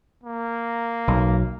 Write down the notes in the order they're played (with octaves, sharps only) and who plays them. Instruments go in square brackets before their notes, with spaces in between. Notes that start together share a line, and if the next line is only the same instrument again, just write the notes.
[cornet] A#3
[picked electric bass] B1